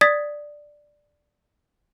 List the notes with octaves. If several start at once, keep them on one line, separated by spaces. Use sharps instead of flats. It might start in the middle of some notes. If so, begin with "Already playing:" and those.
D5 D#6 G#6 A6 B6